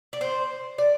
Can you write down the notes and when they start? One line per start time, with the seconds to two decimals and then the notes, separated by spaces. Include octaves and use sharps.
0.13 D5
0.21 C5
0.78 D5